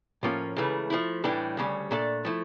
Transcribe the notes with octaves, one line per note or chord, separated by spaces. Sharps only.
A2 F3 A#3 C#4 F4
C#2 C#3 E3 A3
F3 A3 E4
A2 E3 G3 D4 A4
D2 C#3 G3 C#4
A#2 A3 D4 A4 D5
F3 A3 E4